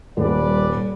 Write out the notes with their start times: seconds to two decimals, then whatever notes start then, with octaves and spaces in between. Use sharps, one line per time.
0.17 D#1 G3 B4 D5